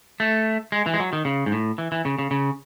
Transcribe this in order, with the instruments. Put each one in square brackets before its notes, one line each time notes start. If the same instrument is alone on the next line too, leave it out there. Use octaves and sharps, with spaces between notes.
[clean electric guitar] A3
G#3
E3
G#3
F#3
D#3
C#3
G#2
A2
E3
E3
C#3
C#3
C#3